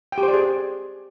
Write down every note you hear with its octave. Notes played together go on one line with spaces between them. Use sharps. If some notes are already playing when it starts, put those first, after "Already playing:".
G5
G4
C5
D5
G#4